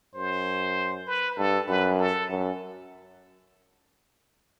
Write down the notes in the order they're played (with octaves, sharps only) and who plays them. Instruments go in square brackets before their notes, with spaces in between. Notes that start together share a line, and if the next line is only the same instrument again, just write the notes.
[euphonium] F#2 [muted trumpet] C5
[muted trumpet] B4
[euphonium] G2 [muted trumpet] A4
[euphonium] F#2 [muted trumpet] B4
[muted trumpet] A4
[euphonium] F#2